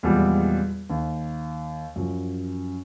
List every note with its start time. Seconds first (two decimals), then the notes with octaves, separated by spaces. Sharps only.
0.03 E2 A#2 F3 G3 G#3
0.90 D#2
1.96 F#2 F3